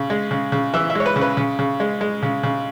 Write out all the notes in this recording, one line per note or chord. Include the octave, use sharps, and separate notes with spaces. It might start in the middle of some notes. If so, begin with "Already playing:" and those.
Already playing: C#3
G#3
C#3
C#3
E3 E5
E5
G#3 C#5
B4
C#3
B4
C#3
C#3
G#3
G#3
C#3
C#3